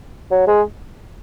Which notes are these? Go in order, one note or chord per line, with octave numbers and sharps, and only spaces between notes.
F#3
G#3